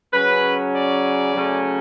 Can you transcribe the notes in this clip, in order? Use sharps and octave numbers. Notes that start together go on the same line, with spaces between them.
C#3 F#3 C#4 B4
D5
C#3 F#3 A3 C#4